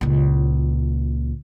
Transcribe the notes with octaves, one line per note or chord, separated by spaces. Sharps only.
C#2 A#2